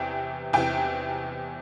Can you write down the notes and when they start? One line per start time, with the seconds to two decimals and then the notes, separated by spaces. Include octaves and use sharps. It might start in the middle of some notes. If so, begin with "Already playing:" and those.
Already playing: E2 C3 E3 G5
0.53 E2 C3 E3 G5